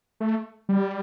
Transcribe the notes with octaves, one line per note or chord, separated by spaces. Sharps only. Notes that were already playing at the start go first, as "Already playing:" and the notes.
A3
G3